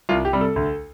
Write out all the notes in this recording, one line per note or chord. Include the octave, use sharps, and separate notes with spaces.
C2 F4
G4
C3 G3
A4
D2